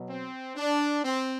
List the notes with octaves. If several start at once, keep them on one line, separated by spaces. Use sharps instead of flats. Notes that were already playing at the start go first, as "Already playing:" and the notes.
Already playing: B2 F#3
C4
D4
C4